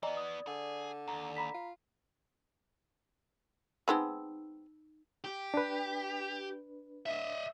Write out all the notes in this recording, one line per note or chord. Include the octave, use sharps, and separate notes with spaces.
E3 B3 D5 D#5 G#5 A#5
D#6
D3 G#4
D#2 A#5
A#5 B5 B6
F4
G#3 B3 C4 D#4 B5 E6
G4
D4 B4
D#5 E5